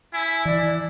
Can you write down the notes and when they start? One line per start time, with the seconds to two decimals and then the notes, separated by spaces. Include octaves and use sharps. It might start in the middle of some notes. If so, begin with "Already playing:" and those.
0.14 E4 G#5
0.45 E3 D5